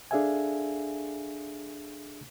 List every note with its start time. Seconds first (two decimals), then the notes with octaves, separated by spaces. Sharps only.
0.11 D4 G#4 A4 E5 F5 G#5